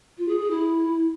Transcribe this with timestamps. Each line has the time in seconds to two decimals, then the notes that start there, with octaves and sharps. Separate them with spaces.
0.18 F4
0.28 G#4
0.40 G#4
0.50 E4